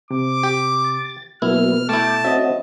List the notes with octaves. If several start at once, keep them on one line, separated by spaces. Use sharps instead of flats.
C3 D6
G4
A6
B2 F#3 A#3 B3 E4 F6
A3 E4 G5 A5 D6
C4 C#4 F#4 D#5 E5